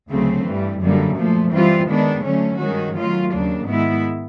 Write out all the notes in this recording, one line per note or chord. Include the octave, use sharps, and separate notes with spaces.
D2 C#3 F#3 A3 C4
G2 E3 G3
F#2 D3 G3 A#3
A#2 F3 A3
E3 G3 C4 F4
D#3 G#3 B3 D4
D3 F#3 A3 C#4
G2 D#3 G#3 C#4 F#4
D#3 F#3 A3 C#4 F4
D#2 C#3 F#3 A#3 D4
G#2 D#3 G#3 B3 E4